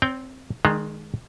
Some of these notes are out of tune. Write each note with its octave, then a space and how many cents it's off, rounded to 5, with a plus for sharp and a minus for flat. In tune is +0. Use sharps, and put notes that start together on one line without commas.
C4 +0 C#5 +40 G5 +0
D#3 +0 G#3 +10 D4 +40